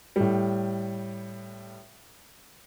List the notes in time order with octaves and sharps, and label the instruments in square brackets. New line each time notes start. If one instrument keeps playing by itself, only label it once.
[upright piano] A2 G3